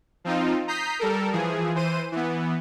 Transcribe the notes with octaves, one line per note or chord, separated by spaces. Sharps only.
F3 C4 D#4 F4
A#5 D#6 G6 B6 C7
G3 A4 A#4
E3 F3 G#4
E3 C5 D#7
E3 B3